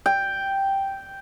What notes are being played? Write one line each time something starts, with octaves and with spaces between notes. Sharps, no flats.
G5